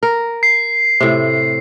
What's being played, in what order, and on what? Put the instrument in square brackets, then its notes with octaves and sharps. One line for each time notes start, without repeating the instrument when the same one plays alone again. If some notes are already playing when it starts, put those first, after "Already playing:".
[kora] A#4
[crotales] C7
[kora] A2 C3